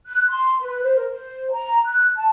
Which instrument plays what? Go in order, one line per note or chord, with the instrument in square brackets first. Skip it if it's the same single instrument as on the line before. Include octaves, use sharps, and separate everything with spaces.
[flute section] F#6
C6
B4
C5
A#4
C5
A#5
F#6
A5